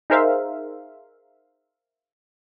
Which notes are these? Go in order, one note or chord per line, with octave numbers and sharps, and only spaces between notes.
D#4 G#4 A#4 C5 E5 F5